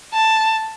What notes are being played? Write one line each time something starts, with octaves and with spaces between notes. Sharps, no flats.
A5